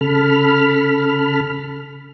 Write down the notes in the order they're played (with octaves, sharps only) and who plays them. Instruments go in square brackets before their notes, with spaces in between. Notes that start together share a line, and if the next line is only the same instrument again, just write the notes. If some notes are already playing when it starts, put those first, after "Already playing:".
[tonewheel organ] C#3 A4 B5 F6